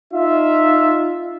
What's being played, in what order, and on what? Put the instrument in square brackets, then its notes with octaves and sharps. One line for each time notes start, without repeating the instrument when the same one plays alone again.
[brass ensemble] D#4 F4 E5